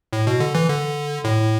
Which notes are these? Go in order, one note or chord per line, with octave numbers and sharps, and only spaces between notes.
A2
B2
D3
E3
D3
A2